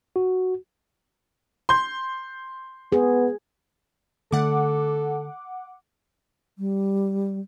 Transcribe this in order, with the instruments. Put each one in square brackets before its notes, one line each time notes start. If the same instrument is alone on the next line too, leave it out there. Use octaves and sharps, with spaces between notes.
[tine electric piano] F#4
[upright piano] C6 G6
[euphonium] B3 [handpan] G#4
[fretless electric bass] D3 A3 [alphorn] A4 [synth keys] F#5 D6
[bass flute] G3